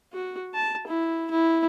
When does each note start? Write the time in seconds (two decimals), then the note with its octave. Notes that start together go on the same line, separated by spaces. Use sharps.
0.13 F#4
0.54 A5
0.87 E4
1.31 E4